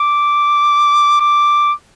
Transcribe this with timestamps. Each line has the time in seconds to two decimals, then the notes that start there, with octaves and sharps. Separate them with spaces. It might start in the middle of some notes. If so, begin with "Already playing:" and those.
Already playing: D6
1.20 D6